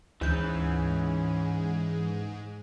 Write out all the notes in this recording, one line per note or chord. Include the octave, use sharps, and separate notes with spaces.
D2 G#2 E3 C#4 G6